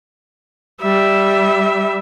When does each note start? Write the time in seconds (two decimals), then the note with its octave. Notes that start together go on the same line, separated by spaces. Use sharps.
0.82 G3 E5